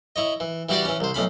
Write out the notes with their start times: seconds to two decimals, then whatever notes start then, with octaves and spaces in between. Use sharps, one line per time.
0.16 E4 C#5 D#5
0.40 E3
0.69 E3 G3 E4 F#4 G4 D5
0.85 E3 C#4
1.00 C2 C5
1.14 B1 A2 C#4 B5